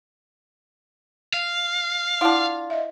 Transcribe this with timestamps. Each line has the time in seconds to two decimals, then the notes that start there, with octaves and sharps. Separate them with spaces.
1.33 F5
2.21 D4 E4 F4 F#5
2.70 D#5 E5